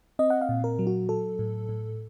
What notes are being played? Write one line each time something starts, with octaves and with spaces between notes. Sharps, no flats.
C4 D#5
F#5
F5
A#2
A#4
F#3
F#4
F#3 A4
A2
A2